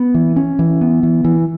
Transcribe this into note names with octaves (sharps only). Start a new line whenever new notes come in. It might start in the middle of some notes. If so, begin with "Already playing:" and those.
Already playing: B3
E3
C#4
E3
B3
E3
E3